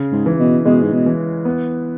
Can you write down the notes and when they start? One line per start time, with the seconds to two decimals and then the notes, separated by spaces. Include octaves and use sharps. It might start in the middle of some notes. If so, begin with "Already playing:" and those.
Already playing: C#3
0.12 G#2
0.26 E3
0.39 B2
0.65 B2 G#3
0.82 G#2
0.92 B2
1.06 E3
1.45 B3